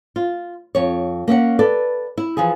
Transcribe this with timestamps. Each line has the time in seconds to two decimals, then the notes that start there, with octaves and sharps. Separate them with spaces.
0.16 F4
0.75 F2 C#5
1.28 A#3 C#4 E5 F#5
1.59 A4 B4 D5
2.18 E4
2.37 E3 F3 F4 G#4